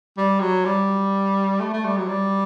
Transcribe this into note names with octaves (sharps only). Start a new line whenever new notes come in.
G3
F#3
G3
A3
A3
G3
F#3
G3